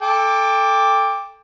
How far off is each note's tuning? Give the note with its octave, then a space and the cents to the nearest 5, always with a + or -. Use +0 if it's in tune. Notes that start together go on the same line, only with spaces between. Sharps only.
A4 +0 G5 +25 D6 +0